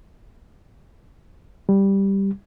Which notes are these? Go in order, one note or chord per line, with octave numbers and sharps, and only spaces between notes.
G3